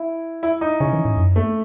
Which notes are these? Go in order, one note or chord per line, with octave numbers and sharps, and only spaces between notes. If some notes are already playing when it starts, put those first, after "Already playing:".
Already playing: E4
E4
D#4
C#3 C#4
E3
A2
F#2
A3